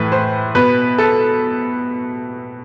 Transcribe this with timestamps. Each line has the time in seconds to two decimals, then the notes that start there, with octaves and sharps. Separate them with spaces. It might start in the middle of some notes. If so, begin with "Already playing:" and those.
Already playing: A2 E3 B4
0.12 C5
0.55 B2 B4
0.98 A4